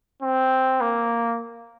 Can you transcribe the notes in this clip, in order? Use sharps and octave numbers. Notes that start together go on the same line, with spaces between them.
C4
A#3